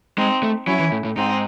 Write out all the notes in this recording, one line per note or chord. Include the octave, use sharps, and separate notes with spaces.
G#3 C4 D#4
A3
F#3 C#4 E4
E3
A2
A2
G#2 C4 D#4